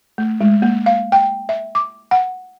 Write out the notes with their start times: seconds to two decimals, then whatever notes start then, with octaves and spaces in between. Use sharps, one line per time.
0.18 A3
0.41 G#3
0.62 A#3
0.86 F5
1.12 G5
1.49 E5
1.75 D6
2.11 F#5